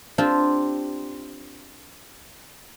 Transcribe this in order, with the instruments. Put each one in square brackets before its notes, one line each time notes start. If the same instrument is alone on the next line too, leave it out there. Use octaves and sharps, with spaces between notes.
[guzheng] C4 D4 F4 G4